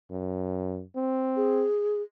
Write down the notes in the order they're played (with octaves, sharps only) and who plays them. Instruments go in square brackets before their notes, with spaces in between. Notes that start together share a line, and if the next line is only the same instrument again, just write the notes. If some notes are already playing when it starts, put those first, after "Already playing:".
[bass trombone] F#2
C4
[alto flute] G#4